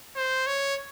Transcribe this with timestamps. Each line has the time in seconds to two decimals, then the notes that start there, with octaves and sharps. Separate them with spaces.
0.16 C5
0.47 C#5